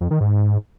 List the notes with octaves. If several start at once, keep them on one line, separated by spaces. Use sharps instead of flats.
F2
D#3
G#2